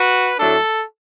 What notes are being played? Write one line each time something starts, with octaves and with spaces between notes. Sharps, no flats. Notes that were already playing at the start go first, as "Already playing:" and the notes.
Already playing: F#4 B4
A2 F#3 A3 D4 A4